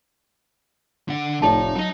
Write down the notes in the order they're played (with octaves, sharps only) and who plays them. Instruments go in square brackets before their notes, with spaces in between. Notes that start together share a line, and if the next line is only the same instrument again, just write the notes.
[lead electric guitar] D3 F#5
[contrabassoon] F1 [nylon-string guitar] A2 D5 [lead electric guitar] D#4 [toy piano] A5
[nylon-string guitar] F#3 [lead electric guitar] D#4 D#5